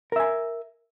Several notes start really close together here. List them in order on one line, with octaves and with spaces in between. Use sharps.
A#4 E5 G#5